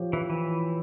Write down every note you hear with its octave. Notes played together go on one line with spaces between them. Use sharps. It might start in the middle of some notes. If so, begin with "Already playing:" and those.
Already playing: F3 G4 C#5
E3 F3
E3